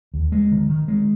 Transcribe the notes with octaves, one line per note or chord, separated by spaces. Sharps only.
D#2
G#3
D#3
D#3
G#3